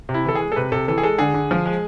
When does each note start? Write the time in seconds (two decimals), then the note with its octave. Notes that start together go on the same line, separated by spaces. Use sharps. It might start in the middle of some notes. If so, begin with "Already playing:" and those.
0.09 C3
0.14 E4
0.25 E3 A4
0.35 G#4
0.41 G#3
0.52 A4
0.56 C3 B4
0.72 C3 A4
0.88 E3 A4
0.98 G#4
1.03 G#3 A4
1.18 D3 G#4
1.34 D3
1.51 F3
1.66 G#3